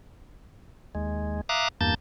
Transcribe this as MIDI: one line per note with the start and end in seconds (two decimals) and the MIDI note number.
0.95 1.41 39
0.95 1.41 56
1.49 1.68 76
1.49 1.68 77
1.49 1.68 82
1.49 1.68 86
1.49 1.68 87
1.49 1.68 90
1.81 1.94 40
1.81 1.94 43
1.81 1.94 58
1.81 1.94 81
1.81 1.94 91
1.81 1.94 93